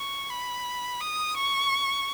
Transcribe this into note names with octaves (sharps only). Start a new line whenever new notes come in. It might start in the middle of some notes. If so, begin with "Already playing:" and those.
Already playing: C#6
B5
D#6
C#6